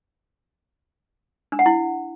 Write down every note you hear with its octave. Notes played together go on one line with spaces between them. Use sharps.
D4
F#5
E4